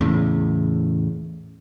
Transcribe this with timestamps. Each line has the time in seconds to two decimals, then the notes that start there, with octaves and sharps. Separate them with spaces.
0.01 E2 A2 C#3